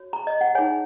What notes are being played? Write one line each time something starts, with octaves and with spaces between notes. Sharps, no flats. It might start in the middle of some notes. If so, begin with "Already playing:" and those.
Already playing: F#4 C#5
A#5
D#5
F#5
D#4 G#4 C#5 G#5